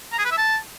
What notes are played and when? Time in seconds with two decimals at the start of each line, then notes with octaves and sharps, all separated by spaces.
0.12 A#5
0.19 G#4
0.25 B4
0.31 E5
0.37 A5